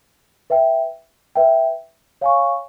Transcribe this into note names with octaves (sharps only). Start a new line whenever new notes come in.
B4 E5 G5
B4 E5 G5
C#5 F5 G#5 C#6